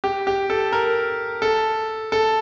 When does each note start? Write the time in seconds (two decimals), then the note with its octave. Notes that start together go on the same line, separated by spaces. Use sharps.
0.04 G4
0.27 G4
0.50 A4
0.72 A#4
1.42 A4
2.12 A4